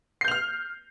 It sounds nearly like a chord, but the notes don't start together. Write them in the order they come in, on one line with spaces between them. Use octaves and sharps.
C7 G6 F7 F6